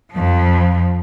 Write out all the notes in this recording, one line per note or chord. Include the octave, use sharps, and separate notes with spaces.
F2 F3